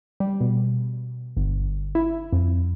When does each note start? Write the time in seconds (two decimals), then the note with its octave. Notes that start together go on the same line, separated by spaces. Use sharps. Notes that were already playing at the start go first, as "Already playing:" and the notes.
0.20 G3
0.41 B2
1.37 G1
1.95 E4
2.33 F2